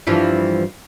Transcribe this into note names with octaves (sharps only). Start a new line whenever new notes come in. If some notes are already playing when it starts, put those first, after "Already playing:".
G2 E3 F3